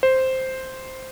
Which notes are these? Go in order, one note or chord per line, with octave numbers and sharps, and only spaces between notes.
C5